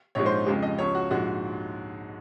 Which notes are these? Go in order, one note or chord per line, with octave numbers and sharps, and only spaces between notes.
A#1 G#2 F3 G#3 C#5
C5
F2 C#3 F3 G#3
D#5
C#2 C#3 F3 C#5
F#4
A#1 G#2 F3 G#3 F#4